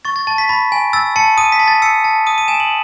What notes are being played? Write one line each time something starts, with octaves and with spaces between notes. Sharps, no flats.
C#6 A6
A6
A5 A6
B6
B5 A6
G#5
E6 A6
A5 C#7
D#6 D#7
B6
A5
A6
E6 C#7
A5
D#6 D#7
D#7
G#5 E7
F#7